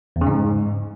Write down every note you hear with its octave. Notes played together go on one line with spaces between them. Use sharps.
E2
C#3
G#2